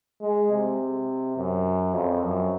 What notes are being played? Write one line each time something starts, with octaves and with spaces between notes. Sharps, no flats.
G#3
C3
F#2
F2
F#2